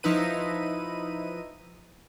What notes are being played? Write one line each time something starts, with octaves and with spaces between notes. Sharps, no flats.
F3 D#4 E4 B4 D#7